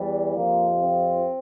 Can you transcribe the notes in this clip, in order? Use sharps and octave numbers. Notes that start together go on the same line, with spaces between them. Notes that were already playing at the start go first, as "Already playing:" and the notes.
Already playing: E2 E3 G3
F2 C3 F3 A#3
C4